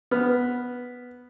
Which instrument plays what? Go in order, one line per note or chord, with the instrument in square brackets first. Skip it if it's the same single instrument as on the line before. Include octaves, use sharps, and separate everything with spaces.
[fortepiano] B3 F6